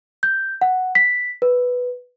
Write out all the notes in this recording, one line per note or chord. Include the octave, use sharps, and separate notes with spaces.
G6
F#5
B6
B4